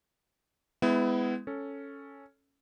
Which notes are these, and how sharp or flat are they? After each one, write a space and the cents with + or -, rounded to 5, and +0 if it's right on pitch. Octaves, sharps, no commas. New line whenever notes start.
G#3 -5 B3 +30 E4 +0
C#4 +0 A4 +0